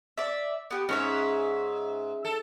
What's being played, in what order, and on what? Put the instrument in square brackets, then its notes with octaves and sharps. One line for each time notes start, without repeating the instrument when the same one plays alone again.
[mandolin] D5 E5
B3 G4
[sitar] G#2 [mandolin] C#4 C#5 E5
[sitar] A4